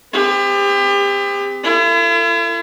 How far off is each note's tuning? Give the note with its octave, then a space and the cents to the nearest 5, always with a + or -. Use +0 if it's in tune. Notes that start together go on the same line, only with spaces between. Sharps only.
C4 -35 G4 +35
E4 +45 A4 +35